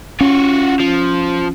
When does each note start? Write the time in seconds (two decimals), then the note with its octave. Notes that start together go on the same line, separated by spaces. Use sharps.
0.21 C#4 F4 F#4
0.80 F3